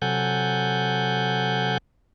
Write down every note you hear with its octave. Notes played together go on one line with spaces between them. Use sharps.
C3 F#3 A4 F#5 G#5 G6